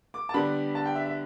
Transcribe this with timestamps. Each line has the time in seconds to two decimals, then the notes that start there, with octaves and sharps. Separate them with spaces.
0.14 D6
0.29 A5
0.34 D3 G3 B3 D4 B5
0.75 A5
0.85 G5
0.95 E5
1.06 E5